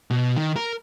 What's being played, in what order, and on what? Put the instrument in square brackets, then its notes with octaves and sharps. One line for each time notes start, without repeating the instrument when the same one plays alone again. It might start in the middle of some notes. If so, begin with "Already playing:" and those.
[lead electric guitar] B2
D#3
A#4